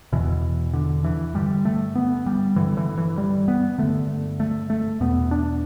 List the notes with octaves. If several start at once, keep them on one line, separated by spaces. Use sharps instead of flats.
E2 B2 E3
D3
E3
G2 D3 G3
A3
B3
G3
G2 D3 E3
E3
E3
G3
B3
G2 D3 A3
A3
A3
E2 B2 B3
D4